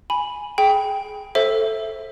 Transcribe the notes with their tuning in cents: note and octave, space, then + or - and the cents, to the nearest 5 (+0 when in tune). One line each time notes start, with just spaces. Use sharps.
G#5 +0 B5 -5
G#4 +25 G5 +0
A4 +0 C5 +20 E5 +0